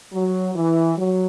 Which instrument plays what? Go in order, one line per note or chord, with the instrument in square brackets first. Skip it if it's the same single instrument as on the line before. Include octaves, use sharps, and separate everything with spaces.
[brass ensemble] F#3
E3
F#3